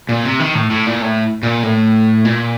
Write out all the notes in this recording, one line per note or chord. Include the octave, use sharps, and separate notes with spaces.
A#2
C3
D#3
A2
A2
A#2
A2
A#2
A2
A#2